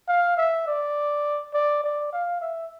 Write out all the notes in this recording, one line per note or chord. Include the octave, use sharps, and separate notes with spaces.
F5
E5
D5
D5
D5
F5
E5